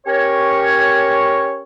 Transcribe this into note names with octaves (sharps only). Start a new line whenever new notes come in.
C#4 G4 A#4 C#5